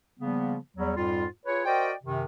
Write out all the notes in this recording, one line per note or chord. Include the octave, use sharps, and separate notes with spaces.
C#3 F3 G3 A#3 B3
E2 F#3 G3
F2 G#2 G3 F4
F4 G#4 B4 C#5
F#4 A#4 C5 D5 D#5 G5
F#2 C3 D#3